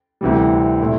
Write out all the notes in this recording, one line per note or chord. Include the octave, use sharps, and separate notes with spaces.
D2 C3 E3 G3
A#2 A3 E4